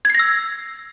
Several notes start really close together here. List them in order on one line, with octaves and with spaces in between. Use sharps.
G#6 C7 A#6 E6